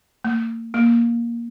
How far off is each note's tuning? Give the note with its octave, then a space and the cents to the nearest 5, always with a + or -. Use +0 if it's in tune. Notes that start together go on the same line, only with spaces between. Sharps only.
A#3 -35
A#3 +10